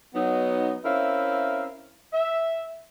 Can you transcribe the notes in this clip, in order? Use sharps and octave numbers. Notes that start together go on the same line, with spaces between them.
F#3 B3 D#4
C4 C#4 E4 A#4 E5 F5
E5